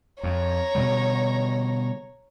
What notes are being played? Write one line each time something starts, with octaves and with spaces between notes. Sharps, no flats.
F2 C#5 A#5
B2 D3 G3